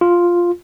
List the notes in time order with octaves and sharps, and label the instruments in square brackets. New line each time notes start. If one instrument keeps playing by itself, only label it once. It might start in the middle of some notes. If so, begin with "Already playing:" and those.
[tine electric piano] F4